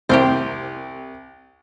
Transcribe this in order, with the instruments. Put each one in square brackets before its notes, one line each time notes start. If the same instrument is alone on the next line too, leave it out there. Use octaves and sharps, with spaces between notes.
[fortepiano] C2 [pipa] G4 A#4 C5